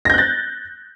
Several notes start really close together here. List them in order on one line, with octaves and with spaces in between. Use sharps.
A#6 G6 F#6 A6